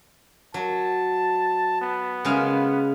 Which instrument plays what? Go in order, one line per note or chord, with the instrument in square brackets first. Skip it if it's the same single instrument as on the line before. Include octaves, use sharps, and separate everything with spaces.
[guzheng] F#3 [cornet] A5
[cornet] B3
[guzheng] C#3 G#3 F5